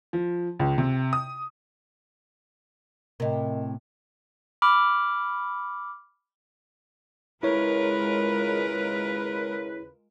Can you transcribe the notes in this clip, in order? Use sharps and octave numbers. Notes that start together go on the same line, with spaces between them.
F3
C#2
C3
D#6
A2 C3 A#4 D#5
B5 D6 F6
D#2 C#3 G#3 E4 F4 A#4 B4 C#5